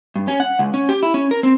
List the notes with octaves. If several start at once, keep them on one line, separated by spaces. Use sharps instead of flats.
G2
C#4
F#5
C#2
C#4
G4
E4
C#4
A#4
C4